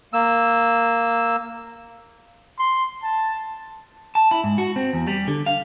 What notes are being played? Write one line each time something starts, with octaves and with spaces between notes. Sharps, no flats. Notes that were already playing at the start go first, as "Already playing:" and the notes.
A#3 E6
C6
A5
A5
E4
G#2
F#4
C4
E2
G3
D3
F5